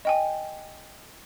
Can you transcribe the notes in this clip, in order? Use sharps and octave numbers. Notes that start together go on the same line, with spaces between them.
D#5 G5 G#5